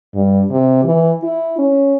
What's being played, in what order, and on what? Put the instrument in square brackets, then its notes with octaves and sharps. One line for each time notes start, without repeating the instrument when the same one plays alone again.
[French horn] G2
C3
E3
E4
C#4